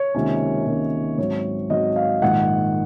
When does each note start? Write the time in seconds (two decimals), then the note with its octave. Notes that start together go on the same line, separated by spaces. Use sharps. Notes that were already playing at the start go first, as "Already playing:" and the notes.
Already playing: C#5
0.15 C#2 C3 D#3 A#3 C#4
0.67 C#2 C3 D#3 A#3 C#4
1.18 G#2 F#3 C4 C#5
1.70 G#2 F#3 C4 D#5
1.96 F5
2.22 A#1 G#2 D#3 F#5